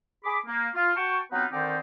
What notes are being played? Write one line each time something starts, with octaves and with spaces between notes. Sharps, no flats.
G#4 B5 D6
A#3
F4
F#4 G5 A5 C#6
F#3 B3 C4 D#4 F4 B4
D3 D#3 C4 D#4 C5 D5